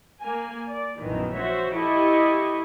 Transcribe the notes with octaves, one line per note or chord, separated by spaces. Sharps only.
A#3 G#5
D5
A#1 F#2 B2 D#3 E3
F#4 C5 C#5 E5
E4 G4 A4 D#5 C#6